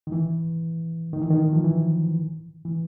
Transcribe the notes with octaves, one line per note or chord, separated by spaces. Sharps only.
D#3
E3
D#3
E3
D#3
F3
E3
E3